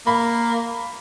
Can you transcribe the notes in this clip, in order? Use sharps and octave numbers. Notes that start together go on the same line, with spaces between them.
A#3 B5